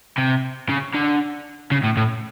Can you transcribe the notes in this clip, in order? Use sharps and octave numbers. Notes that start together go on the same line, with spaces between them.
C3
C#3
D3
C#3
A2
A2